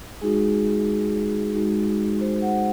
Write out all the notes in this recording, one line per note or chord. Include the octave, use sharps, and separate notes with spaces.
G#3 D#4 F#4 G#4
G#3 D#4 F#4
C5
F#5